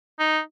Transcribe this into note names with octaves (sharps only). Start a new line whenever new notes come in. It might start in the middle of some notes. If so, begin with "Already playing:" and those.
D#4